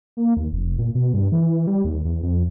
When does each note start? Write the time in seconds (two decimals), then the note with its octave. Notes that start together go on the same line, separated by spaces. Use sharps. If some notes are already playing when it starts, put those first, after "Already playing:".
0.17 A#3
0.37 D#2
0.52 F1
0.79 A#2
0.95 B2
1.14 G2
1.32 E3
1.67 G3
1.85 D#2
2.05 E2
2.23 F2